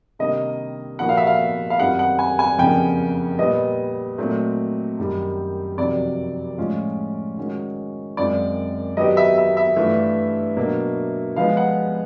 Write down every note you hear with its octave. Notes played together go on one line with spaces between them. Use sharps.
C3 D#3 G3 A#3 D4 D#5
A#2 F3 A#3 D#4 F#4 F#5
F5
E5
F5
F5
F#2 D#3 G3 C4 F4 F#5
F#5
G#5
G#5
F2 C#3 F3 A#3 G5
A#2 G3 B3 D#5
A#2 F#3 A3 C4
F#2 D#3 G3
F2 C3 D#3 F#3 D5
A2 F3 G#3 C#4 F4
D#3 G#3 C#4 F#4
F#2 D#3 G#3 C4 F4 D5
D#3 F#3 B3 D#4 G4 D#5
E5
E5
E5
G2 E3 A3 D4 F4
B2 F#3 A#3 D4
F3 G#3 B3 F5
F#5